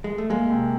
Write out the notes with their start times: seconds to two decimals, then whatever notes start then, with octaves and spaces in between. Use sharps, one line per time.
0.04 G#3
0.18 A3
0.30 G#3 A#3
0.50 C3